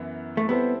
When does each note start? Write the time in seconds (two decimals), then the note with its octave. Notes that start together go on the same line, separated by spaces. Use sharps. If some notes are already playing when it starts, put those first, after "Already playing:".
Already playing: F#2 E3 B3 E4
0.37 A3
0.48 G3 B3 C4 E4 A4 C5